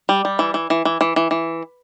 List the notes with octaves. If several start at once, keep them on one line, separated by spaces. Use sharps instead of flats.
G3
G3
E3
E3
E3
E3
E3
E3
E3